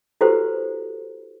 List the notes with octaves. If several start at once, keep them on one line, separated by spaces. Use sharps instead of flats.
E4 F#4 G4 A4 B4 C5